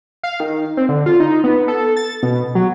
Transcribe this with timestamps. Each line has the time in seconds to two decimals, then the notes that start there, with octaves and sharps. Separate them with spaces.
0.23 F5
0.40 D#3
0.77 C4
0.89 D3
1.06 F4
1.20 D#4
1.44 B3
1.68 A4
1.97 A6
2.23 B2
2.55 F#3